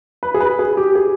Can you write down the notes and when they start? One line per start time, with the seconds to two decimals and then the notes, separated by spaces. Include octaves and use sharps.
0.23 B4
0.34 G#4
0.40 B4
0.59 G#4
0.77 G4
0.95 G#4